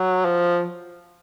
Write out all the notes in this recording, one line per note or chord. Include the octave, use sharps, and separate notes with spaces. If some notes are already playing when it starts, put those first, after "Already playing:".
Already playing: F#3
F3